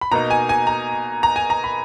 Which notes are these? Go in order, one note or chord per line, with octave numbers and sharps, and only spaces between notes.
B5
B2 A#3 D#4 A#5
G#5
G#5
A#5
A#5
G#5
A#5
B5